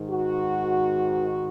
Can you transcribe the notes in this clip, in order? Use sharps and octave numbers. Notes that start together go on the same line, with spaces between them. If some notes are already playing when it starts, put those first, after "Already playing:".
Already playing: G#2 D#3
F#4